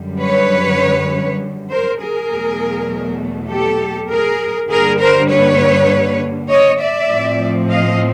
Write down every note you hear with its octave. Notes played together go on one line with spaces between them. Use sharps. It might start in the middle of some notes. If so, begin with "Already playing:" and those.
Already playing: F#2 D3 G3
B4 C#5
A#4 C5
G#4 A#4
E2 B2 F#3 A3
G4 A4
G#4 A#4
G2 D3 G3 A#3 G#4 A#4
A#4 C5
B4 C#5
C#5 D#5
D5 E5
A2 F3 A3 C4
D#5 F5